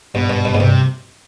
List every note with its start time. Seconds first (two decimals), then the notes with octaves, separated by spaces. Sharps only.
0.15 G2 B2
0.30 G2
0.45 G2
0.55 G#2
0.60 G2 C3